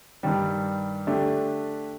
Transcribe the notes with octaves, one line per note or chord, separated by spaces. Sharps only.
G2 D#3 G3
D3 A3 D4 G4